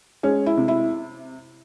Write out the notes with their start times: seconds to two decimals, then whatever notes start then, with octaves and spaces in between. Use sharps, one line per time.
0.23 G#3 C#4
0.46 E4
0.57 C3
0.68 E4